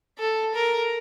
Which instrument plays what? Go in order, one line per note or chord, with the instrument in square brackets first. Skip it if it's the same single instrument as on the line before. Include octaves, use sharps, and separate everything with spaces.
[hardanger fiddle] A4
A#4